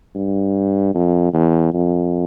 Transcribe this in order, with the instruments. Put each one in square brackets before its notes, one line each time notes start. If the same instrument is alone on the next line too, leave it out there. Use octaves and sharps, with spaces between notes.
[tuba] G2
F2
E2
F2